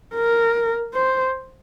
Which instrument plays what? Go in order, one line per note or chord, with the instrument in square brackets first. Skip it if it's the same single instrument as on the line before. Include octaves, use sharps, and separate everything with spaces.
[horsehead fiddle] A#4
C5